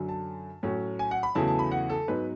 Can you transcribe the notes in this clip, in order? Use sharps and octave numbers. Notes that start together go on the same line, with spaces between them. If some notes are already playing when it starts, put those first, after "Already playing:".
Already playing: F#2 D3 F#3
A5
A2 F#3 C#4
G#5
F#5
B5
E2 C#3 F#3 A3 E4 A5
A5
B5
F#5
A4
G#2 F#3 B3 B4